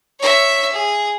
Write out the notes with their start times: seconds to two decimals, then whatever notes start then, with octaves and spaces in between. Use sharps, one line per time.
0.20 C#5 E5
0.72 G#4